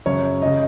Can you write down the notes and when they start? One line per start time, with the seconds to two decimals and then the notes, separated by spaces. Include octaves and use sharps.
0.06 F#2 C#3 C#5
0.42 C#3 D#5